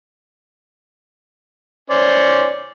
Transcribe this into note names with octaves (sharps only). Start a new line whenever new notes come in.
C#4 C5 D5